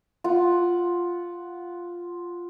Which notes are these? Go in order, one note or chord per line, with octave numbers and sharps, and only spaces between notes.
F4 F#5